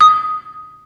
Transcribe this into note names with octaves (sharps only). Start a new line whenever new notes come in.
D#6